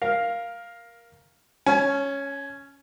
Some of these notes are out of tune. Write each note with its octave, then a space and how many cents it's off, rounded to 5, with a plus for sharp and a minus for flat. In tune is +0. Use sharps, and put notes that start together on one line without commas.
A#4 +10 F5 +0
C#4 +0 G#5 +40